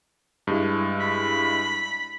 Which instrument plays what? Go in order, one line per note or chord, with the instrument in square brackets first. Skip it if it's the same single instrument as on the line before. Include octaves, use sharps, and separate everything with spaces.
[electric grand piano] G2 G#3 E4
[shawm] B5